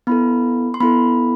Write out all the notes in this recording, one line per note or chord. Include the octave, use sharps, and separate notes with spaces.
B3 E4 A4 B5
C6
B3 E4 A4 B5